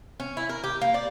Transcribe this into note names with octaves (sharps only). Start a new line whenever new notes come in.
C#4
E4
A#4
G4
A#3
D5